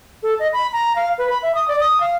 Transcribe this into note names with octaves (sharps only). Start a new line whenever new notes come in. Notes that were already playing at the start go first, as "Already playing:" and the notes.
A4
D#5
B5
A#5
F5
B4
B5
E5
D#6
D5
D#6
F5